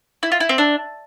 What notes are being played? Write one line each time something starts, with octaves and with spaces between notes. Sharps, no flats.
E4
F4
E4
C4
D4